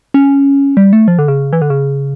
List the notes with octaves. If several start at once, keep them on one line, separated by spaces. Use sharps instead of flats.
C#4
G3
A3
F3
D3
C#3
E3
D3
C#3